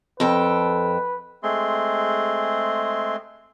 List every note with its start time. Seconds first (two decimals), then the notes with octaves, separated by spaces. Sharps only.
0.20 F2 A4 B4 G5
1.43 G#3 A3 C4 G#4 C6